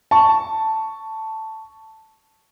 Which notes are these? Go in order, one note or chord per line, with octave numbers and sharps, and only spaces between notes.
A5 C#6